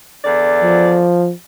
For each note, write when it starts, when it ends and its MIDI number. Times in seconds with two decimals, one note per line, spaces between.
0.23 1.03 40
0.23 1.03 50
0.23 1.03 74
0.63 1.32 53